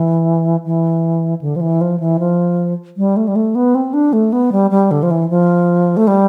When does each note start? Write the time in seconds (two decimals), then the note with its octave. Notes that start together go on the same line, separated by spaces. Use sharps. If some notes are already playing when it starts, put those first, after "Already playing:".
Already playing: E3
0.65 E3
1.41 D3
1.56 F3
1.61 E3
1.81 F3
2.00 E3
2.19 F3
2.97 G3
3.17 A3
3.28 G3
3.36 A3
3.55 B3
3.75 C4
3.93 D4
4.13 A3
4.33 B3
4.52 G3
4.71 G3
4.91 D3
5.03 F3
5.11 E3
5.30 F3
5.97 A3
6.07 G3